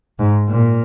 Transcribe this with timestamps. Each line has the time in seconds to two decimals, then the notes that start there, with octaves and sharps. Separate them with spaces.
0.19 G#2
0.48 A#2